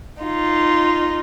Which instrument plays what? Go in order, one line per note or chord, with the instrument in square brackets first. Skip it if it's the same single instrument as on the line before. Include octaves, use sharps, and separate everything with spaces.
[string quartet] D#4 F4